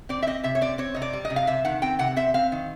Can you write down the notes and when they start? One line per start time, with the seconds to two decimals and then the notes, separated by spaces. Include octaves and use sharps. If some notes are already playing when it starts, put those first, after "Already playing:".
0.09 C4 D5
0.23 E5
0.27 C4 D#5
0.44 C3 E5
0.55 C#5
0.61 C4 D5
0.78 C4 C#5
0.94 C3 D#5
1.02 D5
1.13 G3
1.25 D#5
1.30 C3
1.36 F5
1.47 C3 E5
1.65 D#3 F#5
1.82 C4 G5
1.99 C3 F#5
2.16 C4 E5
2.34 C4 F5
2.52 D#3